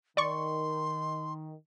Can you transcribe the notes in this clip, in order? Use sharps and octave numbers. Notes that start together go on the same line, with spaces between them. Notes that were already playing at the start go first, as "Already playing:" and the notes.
D#3 D5 C6 C#6